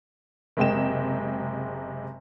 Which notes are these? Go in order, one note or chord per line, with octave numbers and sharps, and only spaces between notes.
F#1 C3 G#3 G5 E7